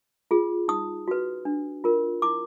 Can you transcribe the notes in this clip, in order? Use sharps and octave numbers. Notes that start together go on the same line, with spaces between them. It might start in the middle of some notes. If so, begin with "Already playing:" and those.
F4 G#4
D#4 D#6
F#4 B4
D4
F4 A#4
E4 D6